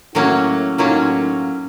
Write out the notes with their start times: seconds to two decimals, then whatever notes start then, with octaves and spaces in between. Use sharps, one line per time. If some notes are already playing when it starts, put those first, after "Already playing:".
0.15 A2 F#3 A#3 C#4 E4 F#4
0.78 A2 F#3 A#3 C#4 D#4 F4